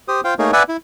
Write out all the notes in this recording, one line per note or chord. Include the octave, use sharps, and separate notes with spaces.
G4 C5 D#6
F4 C5 F5 G5
A3 A#3 D#4 G#4 A#4 C#5
B4 D5 E5 F#5 G#5
E4